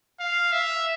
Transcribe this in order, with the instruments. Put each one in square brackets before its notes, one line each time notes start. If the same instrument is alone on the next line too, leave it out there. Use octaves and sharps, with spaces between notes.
[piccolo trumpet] F5
E5